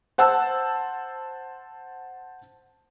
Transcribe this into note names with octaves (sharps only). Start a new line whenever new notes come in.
C5 F#5 A5 E6